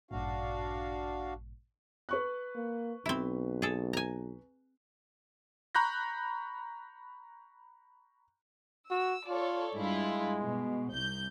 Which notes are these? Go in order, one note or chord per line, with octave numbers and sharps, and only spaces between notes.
A1 G2 A#2 D4 F#4 F5
B4 C#6 F#6
A#3
B1 C4 E4
G#4 A4
G#5 A#5
A#5 B5 C#6 F#6 G6 A#6
F#4 E6
F4 A4 C#5 D5
G2 G#3 E4 F4
B2
C2 G6